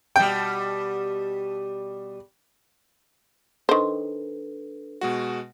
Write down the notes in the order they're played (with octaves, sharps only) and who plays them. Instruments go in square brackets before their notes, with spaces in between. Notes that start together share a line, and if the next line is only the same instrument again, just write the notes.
[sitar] B2 G3 [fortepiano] G5
[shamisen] D#3 C5 [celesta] D4 A4 B4
[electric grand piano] B2 G#3 F#4